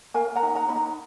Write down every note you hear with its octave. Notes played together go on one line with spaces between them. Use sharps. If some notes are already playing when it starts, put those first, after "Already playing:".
A#4 F5 G#5
F#5 A#5
D#4
F#5 A#5
D#4 B5
F#5 A#5